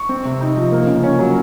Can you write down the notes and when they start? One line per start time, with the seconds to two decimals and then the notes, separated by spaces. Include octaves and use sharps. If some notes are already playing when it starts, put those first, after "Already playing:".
Already playing: C#6
0.09 C4
0.25 C3
0.41 D#4
0.56 F3
0.72 A#3
0.87 C#3
1.04 C#4
1.19 F#3